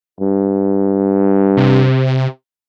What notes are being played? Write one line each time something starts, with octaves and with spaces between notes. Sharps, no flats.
G2
C3